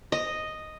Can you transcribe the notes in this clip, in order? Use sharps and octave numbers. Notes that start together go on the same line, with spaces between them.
D#5